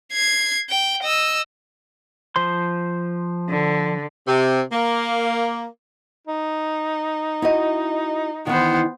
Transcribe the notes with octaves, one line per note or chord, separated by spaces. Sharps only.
G#6 C7
G5
D#5 E6
F3 C5 C6
D3
C3
A#3
D#4
E4 F#4 D#5
D#3 E3 B3 C5